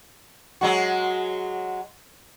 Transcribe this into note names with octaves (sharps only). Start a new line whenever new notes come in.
F#3 G#3 F#4